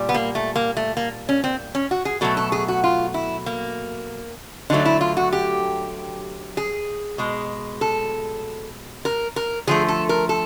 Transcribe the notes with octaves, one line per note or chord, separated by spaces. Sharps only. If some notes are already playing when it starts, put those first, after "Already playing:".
Already playing: A#2 G3
B3
A#3
A3
A#3
A3
A#3
C#4
C4
C#4
F#4
G#4
B2 F#3 A3 A4
A4
G#4
F#4
F4
E4
A#3
D3 F#3 A3 D#4
E4
F4
F#4
G4
G#4
B2 G#3
A4
A#4
A#4
D3 F3 A3 G#4
A4
A#4
A4